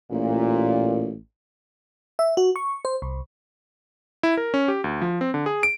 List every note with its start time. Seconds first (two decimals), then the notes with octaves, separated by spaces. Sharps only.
0.11 A1 A#2
2.19 E5
2.37 F#4
2.56 C#6
2.85 C5
3.02 C2
4.23 E4
4.37 A#4
4.54 C#4
4.68 G4
4.84 D2
5.02 F3
5.21 C4
5.34 D3
5.46 G#4
5.63 D7